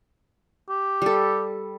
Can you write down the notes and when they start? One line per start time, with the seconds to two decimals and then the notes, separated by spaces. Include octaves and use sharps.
0.69 G4
1.02 G3 A4